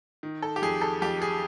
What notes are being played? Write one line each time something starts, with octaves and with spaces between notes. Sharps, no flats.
D#3
A4
G4
F2 G#4
A4
F2 G4
G#4